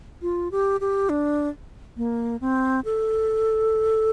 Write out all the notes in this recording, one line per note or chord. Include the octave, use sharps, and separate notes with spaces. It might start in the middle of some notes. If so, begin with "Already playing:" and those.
F4
G4
G4
D4
A#3
C4
A4